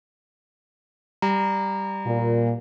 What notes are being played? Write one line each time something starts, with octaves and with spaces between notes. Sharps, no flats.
G3 A#5
A#2